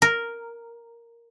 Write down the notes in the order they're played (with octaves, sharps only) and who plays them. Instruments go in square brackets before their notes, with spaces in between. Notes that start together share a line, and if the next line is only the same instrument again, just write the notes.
[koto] A#4